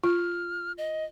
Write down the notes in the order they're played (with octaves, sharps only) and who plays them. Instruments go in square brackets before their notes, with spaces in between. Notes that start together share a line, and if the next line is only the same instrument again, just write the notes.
[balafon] F4 [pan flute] F6
[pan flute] D#5